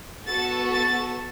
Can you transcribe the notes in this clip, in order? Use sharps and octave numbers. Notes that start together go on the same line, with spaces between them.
B3 F#4 A4 A6
A6